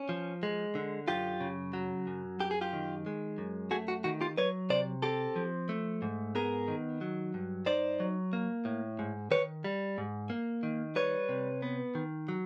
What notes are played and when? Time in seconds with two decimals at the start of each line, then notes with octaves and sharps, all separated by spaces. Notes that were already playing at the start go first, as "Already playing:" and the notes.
Already playing: C#4
0.09 F3
0.43 G#3
0.75 D3
1.08 F#2 F4 G4
1.40 C#3
1.73 F#3
2.07 F#2
2.40 F#2 G4
2.51 G#4
2.61 F4 G4
2.73 D#3
3.06 G#3
3.38 F#2
3.71 A3 F#4 G#4
3.88 F#4
4.04 D#3 F#4
4.21 F4 G4
4.38 F#3 B4 C#5
4.70 C3 C5 D5
5.02 C4 G4 A4
5.36 F3
5.69 A3
6.02 G#2
6.35 B3 G#4 A#4
6.68 D#3
7.01 F#3
7.34 G2
7.66 D#4 C5 D5
8.00 F#3
8.33 A#3
8.65 A2
8.99 G#2
9.31 D#3 B4 C#5
9.64 G3
9.98 G#2
10.30 A#3
10.63 D#3
10.96 G3 B4 C#5
11.29 C3
11.62 B3
11.95 D#3
12.29 F#3